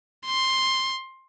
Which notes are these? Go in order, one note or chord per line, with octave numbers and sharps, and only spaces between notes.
C6